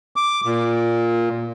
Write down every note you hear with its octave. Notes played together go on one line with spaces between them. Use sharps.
D6
A#2